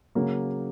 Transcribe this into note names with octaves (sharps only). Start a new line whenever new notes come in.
C#3 F#3 A#3